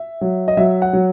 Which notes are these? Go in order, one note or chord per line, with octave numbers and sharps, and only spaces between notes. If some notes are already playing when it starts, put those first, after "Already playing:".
Already playing: E5
F#3
D#5
F#3 E5
F#5
F#3